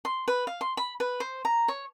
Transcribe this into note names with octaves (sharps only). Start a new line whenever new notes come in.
C6
B4
F5
C6
B5
B4
C5
A#5
C#5